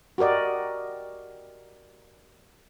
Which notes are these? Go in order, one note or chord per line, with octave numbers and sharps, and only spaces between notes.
F#4 G4 A#4 D5 D#5